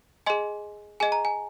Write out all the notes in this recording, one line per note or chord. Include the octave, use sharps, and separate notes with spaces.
G#4 D#5 G#5 C6
G#4 D#5 G#5
A#5
G#5